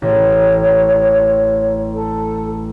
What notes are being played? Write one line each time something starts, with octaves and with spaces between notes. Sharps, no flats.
A1 C#5
A4